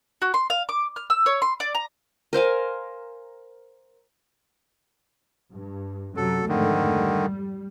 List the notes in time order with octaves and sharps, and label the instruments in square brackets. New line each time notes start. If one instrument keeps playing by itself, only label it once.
[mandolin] F#4
C6
F5
D6
F6
E6
C#5
C6
D5
A#5
[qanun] A#4 C5 F5 G#5
[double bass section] G2
[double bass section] F#2 C3 F#3 [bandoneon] A4
[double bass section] F2 G#2 A3 [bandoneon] D3 D#3
[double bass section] G3